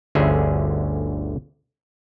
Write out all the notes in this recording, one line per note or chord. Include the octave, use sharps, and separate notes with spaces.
G1 D2 D3 C#4 G#4 E5